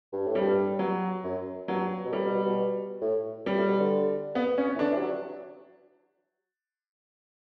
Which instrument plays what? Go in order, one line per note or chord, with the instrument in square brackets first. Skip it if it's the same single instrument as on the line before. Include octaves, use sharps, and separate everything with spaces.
[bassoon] G2
A2
[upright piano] G3
[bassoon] G2
[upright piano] F#3
[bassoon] F#2
[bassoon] G2 [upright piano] F#3
[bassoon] B2
[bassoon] A2 [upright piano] G3
[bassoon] B2
B2
B2
A2
[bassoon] G2 [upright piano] G3
[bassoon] A2
B2
D3
[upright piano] B3
C#4
[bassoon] E3
[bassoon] D3 [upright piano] D4
[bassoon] E3
G3
F#3